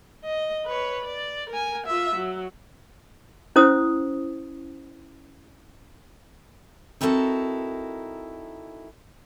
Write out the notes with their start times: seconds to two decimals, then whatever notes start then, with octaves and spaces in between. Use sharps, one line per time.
0.25 D#5
0.66 B4 C#5
1.04 D5
1.50 A#4 G#5
1.86 F4 E5
2.16 F#3
3.56 C#4 E4 C5 D#6
7.01 C4 D#4 E4 F#4 A4 A#4